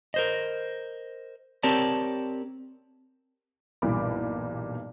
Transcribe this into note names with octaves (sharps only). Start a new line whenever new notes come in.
A#4 C5 D#5
C4 G4 A#4 C#5 D5 A5
B1 G2 A#2 E3 B5 D6